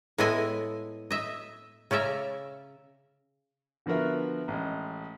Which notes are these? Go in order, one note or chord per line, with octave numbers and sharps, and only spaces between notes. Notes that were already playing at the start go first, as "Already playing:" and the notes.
A2 G#3 B3 E4 D#5 G#5
D#5 E5
C#3 C#4 D5 E5 A#5
D3 F3 B3 F#4 A#4 E5
A1 G#3